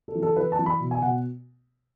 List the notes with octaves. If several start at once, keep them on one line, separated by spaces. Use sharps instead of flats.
A4
E3
A4
E3 B4
A5
E3
B5
B2
G#5
B2 F#5